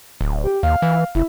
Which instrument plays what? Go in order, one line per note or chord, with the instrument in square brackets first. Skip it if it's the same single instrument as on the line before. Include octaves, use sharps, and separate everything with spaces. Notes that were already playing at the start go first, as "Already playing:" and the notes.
[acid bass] D1
[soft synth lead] G4
[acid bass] D#2 [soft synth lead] F5
[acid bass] E3
[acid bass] F1 [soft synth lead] E4